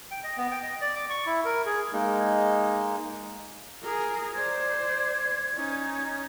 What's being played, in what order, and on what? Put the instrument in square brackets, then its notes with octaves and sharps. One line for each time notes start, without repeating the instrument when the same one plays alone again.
[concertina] G5
D#5
B3
G5
D#5
D5
D6
C#6
E4
A#4
G#4
[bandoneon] G#3 A#3 D#4
[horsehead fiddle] G#4 A#4
[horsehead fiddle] C5 D5 [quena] G#6
[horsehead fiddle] C#4 D#4